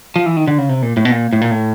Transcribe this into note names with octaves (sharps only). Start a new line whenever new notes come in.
F3
E3
D#3
D3
C#3
C3
A#2
A2
B2
A#2
A2
A#2
A2